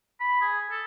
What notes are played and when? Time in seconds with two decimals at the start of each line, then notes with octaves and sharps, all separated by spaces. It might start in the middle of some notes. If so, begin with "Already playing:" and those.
0.20 B5
0.41 G#4
0.71 A4